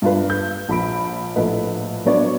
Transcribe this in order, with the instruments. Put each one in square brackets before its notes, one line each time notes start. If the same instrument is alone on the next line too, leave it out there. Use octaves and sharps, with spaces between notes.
[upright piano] G2 F4 B4
G6
A#1 B5 D7
A#1 A2 B4 D#5
F#3 B3 D4 B4 C#5 D5